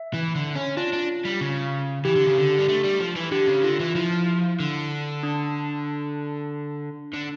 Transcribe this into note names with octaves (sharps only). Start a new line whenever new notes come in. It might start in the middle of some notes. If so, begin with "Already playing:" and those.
Already playing: E5
E3
D3
C#4
D4 F4
D4
G3
C#3
E3 G4
D3
C#3
D3
G3
A3
G3
F3
E3
D3 G4
C#3
D3 F4
E3
F3 E4
D3
D4
D3